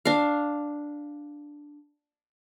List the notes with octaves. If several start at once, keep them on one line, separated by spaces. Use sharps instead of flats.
D4 F5